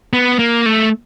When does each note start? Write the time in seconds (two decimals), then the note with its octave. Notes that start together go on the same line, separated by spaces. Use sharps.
0.13 B3
0.39 A#3
0.66 A3